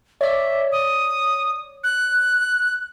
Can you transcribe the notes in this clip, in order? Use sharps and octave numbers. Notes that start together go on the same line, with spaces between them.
C#5 D5 E5
D#6
F#6